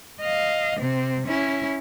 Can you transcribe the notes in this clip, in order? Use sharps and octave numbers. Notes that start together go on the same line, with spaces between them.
D#5 F5
C3 C4
C#4 E4